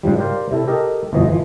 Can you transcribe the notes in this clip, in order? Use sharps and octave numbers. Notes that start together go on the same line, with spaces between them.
G#2 C#3 F3 G3
G4 A#4 C5 D5 F5
C3 E4 A4
G4 A4 A#4 D#5
G1 F2 B2 E3 F3 D#5
E3 F3